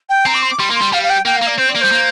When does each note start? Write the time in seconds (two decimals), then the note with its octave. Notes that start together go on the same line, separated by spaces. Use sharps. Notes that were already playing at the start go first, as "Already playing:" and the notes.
0.09 G5
0.26 C4 A#5
0.34 D6
0.42 C6
0.51 D6
0.59 G3 C6
0.70 A#3
0.75 C6
0.81 G3
0.92 G3 F5
1.03 F5
1.09 G5
1.26 A#3 G5
1.37 F5
1.42 A#3
1.47 D5
1.58 C4 C5
1.69 D5
1.76 A#3
1.81 G3 C5
1.92 A#3